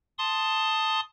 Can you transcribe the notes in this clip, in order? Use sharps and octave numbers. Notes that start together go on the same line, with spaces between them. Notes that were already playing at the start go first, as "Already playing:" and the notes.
A5 C6 D#6